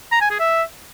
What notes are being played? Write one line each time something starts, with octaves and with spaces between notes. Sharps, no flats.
A#5
G#5
G#4
E5